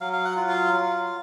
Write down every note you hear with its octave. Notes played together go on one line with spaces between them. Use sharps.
F#3 F5
F5
F#5
F4
F5
F#3